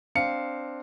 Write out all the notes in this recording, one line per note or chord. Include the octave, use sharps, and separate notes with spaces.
C4 D4 F5 C#7